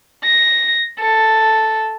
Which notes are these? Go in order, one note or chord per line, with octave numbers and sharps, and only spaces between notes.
A#6
A4